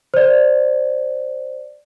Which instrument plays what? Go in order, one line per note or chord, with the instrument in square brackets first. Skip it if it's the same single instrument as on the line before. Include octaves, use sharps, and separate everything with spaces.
[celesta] C5 D5